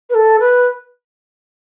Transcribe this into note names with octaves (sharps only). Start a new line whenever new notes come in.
B4
A4
B4